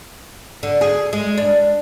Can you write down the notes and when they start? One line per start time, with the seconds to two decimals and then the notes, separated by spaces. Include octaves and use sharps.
0.63 D3
0.81 G#4
1.13 G#3
1.38 D4